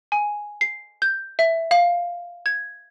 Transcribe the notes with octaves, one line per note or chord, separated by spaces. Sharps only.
G#5
C7
G6
E5
F5
G#6